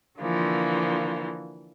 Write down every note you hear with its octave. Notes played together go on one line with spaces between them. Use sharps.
D3 E3 F3 A#3